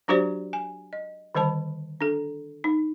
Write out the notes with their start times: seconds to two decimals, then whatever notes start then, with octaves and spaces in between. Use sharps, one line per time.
0.08 F#3 D4 F#4 G4 C5 D5
0.53 G#5
0.93 D#5
1.35 D3 D#3 G3 C5 A5
2.01 D4 A4
2.64 D#4